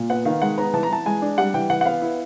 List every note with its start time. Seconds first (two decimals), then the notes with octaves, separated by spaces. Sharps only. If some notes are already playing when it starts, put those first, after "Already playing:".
Already playing: A#2
0.10 B3 F#5
0.25 D#3 F5
0.42 G#3 F#5
0.58 B3 A#5
0.74 E3 A5
0.83 A#5
0.89 E3 A5
1.06 G#3 G#5
1.22 D4
1.38 G3 F#5
1.54 E3 G5
1.70 E3 F#5
1.81 F#5
1.85 B3 F5
2.02 E4